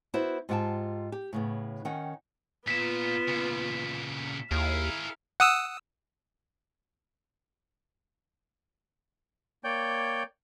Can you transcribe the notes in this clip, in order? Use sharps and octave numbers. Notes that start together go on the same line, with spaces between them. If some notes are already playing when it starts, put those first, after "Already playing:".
B3 E4 F#4 B4 C5 E5
G#2 F4 G4 F#5 G5 A5
G4
A2 C#3 B3
D#3 C#4 F#5 G5
A#2 B3 F4 B6 E7
A#2 C#3
D#2 E4 G#4 A#4 F5
F#5 D#6 E6
A#3 C#5 D5 G5 G6